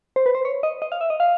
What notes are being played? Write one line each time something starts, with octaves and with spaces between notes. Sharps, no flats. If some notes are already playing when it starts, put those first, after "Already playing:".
C5
B4
C5
C#5
D#5
D#5
F5
E5
D#5
F5